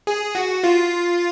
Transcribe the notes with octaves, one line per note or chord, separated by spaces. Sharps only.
G#4
F#4
F4